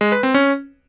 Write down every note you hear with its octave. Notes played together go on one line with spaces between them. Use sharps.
G#3
B4
C4
C#4